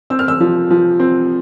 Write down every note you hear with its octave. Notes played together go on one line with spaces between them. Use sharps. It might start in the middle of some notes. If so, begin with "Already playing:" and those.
C4 E6
F6
E6
F3
F3
C4